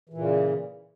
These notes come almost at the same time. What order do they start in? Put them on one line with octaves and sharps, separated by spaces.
E3 A#2 C#3